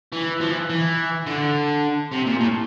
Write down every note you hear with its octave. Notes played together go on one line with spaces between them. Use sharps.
E3
F3
E3
E3
D3
C3
A#2
A2